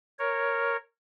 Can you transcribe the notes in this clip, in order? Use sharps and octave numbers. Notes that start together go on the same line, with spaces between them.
A#4 C#5